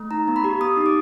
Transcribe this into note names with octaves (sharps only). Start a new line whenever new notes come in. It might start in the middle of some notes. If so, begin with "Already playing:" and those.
Already playing: A3
D#4 A#5
B3
B5
G4
B3 D#6
D#4
D6